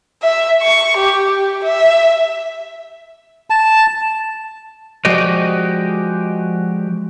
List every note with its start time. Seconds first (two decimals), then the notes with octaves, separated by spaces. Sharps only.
0.23 E5
0.62 C#6
0.97 G4
1.30 G4
1.64 E5
3.50 A5
5.05 F3 G#3 F#4 G4 D5 D#5